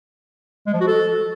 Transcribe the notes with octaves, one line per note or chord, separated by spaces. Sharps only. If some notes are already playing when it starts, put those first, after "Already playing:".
G#3
F3
F#4
A4